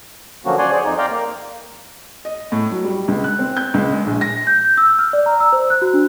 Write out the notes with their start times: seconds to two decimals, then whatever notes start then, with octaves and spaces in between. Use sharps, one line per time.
0.45 D3 F3 F#3 A#3 C#4 F#4
0.58 C#5 D5 F#5 G#5 C6
0.72 G#4 C5 D5
0.85 F2 D#4
0.98 D5 F5 G5 A#5 C6
1.10 A#3
2.25 D#5
2.52 A2
2.71 F#3
2.84 G3
3.08 C#2
3.24 F#6
3.39 C4
3.57 G6
3.74 C#2
3.92 G#3
4.06 A#1
4.21 A#6
4.47 G6
4.65 G6
4.77 E6
4.99 F6
5.13 D5
5.26 A#5
5.40 E6
5.53 C5
5.70 F#6
5.82 F#4
5.94 D4